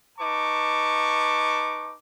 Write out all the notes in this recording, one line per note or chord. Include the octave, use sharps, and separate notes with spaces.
D#4 B4 A5 C#6 D6